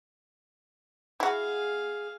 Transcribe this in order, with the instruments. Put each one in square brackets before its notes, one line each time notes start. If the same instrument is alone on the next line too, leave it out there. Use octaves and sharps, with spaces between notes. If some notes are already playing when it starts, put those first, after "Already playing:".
[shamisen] E4 F#4 [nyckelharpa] G#4 F5